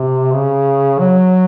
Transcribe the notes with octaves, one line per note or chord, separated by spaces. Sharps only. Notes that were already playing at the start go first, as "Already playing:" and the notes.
Already playing: C3
C#3
F#3